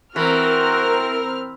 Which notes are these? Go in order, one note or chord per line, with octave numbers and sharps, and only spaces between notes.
E3 C4 F#4 A#4 F6